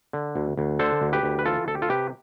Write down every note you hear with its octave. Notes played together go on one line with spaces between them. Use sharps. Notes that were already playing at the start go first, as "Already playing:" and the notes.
D3
D2
D2
D3 A4 C5
D2
G4 B4
D2
B4
E3 F4 A4
D2 A4
G4
F4 A4
C3 G4 B4